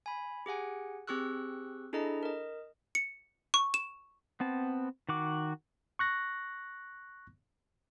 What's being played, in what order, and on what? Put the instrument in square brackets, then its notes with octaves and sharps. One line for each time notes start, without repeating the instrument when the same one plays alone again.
[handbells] G#5 B5
G4 G#4 F#5 G#5
C4 G4 G#4 C#6 E6 F#6
D4 E4 G#4 A4 D#5 A#5
A#4 D#5
[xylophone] C#7
C#6
E7
[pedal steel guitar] B3 C4 A5
D#3 F#4 D6
[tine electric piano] C#6 F#6 A#6